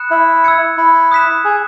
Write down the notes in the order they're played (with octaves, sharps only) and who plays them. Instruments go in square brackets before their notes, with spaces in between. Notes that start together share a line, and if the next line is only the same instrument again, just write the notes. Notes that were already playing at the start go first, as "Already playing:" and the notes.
Already playing: [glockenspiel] B5 D#6 F#6 C#7 E7
[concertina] E4
[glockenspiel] E6 G#6 C#7
[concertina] E4
[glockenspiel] D#6 F#6 B6 E7
[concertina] G#4